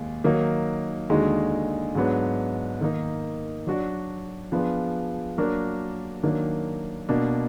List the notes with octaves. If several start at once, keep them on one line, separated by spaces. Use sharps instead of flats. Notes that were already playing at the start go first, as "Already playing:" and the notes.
Already playing: D#2 D#3 G#3
D#3 F#3 A#3 D#4
D#2 D3 G#3 D#4 F#4
G#2 F#3 B3 D4
D#3 A#3 D#4
F#3 D4 F#4 D5
F3 B3 D4 F4 G#4
F#3 A#3 D4 F#4 A#4
D#3 F#3 A#3 D4
B2 A#3 D4